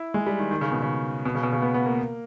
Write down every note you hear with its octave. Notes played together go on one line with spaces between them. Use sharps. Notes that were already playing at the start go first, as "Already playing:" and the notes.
Already playing: E4
G#3
G3
D#3
D#3
C#3
B2
C#3
B2
C#3
B2
C#3
B3
B3
A#3